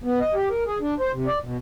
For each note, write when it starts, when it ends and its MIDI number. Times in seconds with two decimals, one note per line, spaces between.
0.04 0.19 59
0.20 0.34 75
0.34 0.49 67
0.50 0.64 70
0.67 0.78 68
0.81 0.94 62
1.00 1.12 72
1.13 1.27 48
1.27 1.39 74
1.43 1.57 47